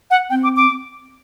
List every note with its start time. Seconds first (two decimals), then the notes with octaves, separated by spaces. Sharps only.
0.11 F#5
0.30 C4 G5
0.43 D6
0.56 D6